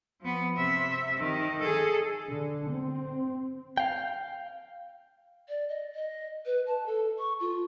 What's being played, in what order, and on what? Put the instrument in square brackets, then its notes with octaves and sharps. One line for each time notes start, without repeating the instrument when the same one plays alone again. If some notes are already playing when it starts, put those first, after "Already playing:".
[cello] F3 B3
C3 E5
D#3
G#4 A4
[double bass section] D3
C4
[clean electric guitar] F5 G5
[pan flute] D5
D#5
D#5
B4
A5
A4
C#6
F4